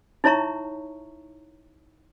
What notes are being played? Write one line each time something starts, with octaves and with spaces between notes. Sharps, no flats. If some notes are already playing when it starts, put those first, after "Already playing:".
D#4 E4 C#5 E5 A#5 C#6